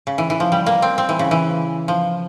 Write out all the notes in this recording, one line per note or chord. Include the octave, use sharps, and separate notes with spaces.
C#3
E3
E3
F3
G3
A#3
C4
C4
E3
C#3
E3
F3